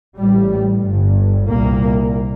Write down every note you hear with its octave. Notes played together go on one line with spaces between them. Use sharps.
A1 A2 G3
G1 G2
C2 A#2 A#3